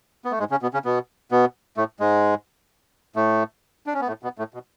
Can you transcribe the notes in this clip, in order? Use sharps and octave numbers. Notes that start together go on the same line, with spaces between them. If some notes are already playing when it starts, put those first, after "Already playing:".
B3
A3
G#2 G#3
C#3 C#4
B2 B3
C#3 C#4
B2 B3
B2 B3
A2 A3
G#2 G#3
A2 A3
D4
C#4
B3
A2 A3
B2 B3
A2 A3
B2